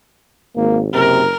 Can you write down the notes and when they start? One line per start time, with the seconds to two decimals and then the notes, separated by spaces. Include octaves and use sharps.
0.57 G#1 A#3
0.93 F#1 C3 A#4